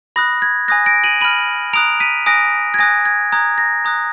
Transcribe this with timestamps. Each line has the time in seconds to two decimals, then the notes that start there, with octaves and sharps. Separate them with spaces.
0.16 B5 D#6 F#6 A#6
0.42 G#6
0.68 G#5 D#6 F#6 A#6
0.86 A#6 D7
1.04 D#7 F#7
1.21 B5 F6 D#7 F#7
1.73 A#5 D#6 F#6 D7 F7
2.00 B6 D#7
2.26 G#5 D#6 F#6 A#6 D7
2.74 G#6
2.79 G#5 D#6 F#6 A#6
3.06 G#6
3.32 A#5 D#6 F#6 G#6
3.58 A#6
3.85 A#5 D#6 F#6